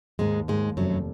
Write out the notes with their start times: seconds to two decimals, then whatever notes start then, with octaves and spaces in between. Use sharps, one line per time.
0.19 D#2 G#2 G#3
0.48 D#2 G#2 G#3
0.77 F1 F#2 F#3